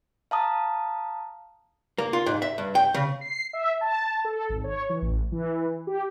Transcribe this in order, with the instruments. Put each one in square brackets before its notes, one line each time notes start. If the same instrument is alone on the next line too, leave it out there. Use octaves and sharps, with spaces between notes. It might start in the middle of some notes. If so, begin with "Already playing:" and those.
[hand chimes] F5 A5 A#5 D#6
[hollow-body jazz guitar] A#3
F4
G#2
E5
G2
G5
C#3
[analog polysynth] C7
E5
A5
A4
G#1
C#5
E3
A1
E3
G4